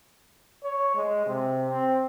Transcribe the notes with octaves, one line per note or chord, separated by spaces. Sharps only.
C#5
G#3
C3
C4